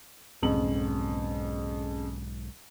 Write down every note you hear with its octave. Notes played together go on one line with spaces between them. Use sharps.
B1 F2 G#2 C#3 F#7